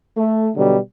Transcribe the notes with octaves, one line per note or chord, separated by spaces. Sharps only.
A3
B2 D3 F#3 G3